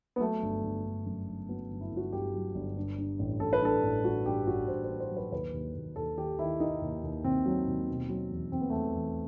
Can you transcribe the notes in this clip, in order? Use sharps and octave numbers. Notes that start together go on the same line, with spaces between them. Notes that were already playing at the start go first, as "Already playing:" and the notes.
B3
F#3 A3
G1
G1
G1
F#2
G1
F#3 B3
G1
E4
G1
F#4
G1 G4
F#3
G1
G2
G2
A1
A1 A4
B4
G2 A4
A1
G2 F#4
G2 G4
A1 F#4
A1 C5
C5
G2
C5
F#3
B4
D#2 B4
D#2
D#2
D#2 A4
D#3 G4
D#3 E4
D#3 D#4
D#2
D#2
D#2 C4
F#3
D#2
B2
F#3
E2
E2 C4
B3
E2 A3
B3
E2